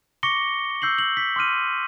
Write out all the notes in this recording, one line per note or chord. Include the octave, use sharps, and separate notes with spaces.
C#6 D6 A#6 C#7 G7
E6 G6 C7 F#7
F#7
B6
C6 D6 F6 D#7